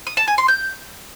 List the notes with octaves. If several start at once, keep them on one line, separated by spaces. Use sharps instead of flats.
D#6
A5
G#5
C6
G6